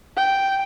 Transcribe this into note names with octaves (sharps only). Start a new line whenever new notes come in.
G5